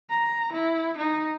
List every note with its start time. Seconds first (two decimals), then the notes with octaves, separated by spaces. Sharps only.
0.10 A#5
0.53 E4
0.98 D#4